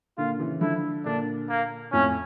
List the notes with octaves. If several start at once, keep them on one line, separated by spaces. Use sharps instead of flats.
A#2 D3 F4
C#3 E3
D3 F3 E4
A#2 D3 D4
A#3
F2 A2 C#4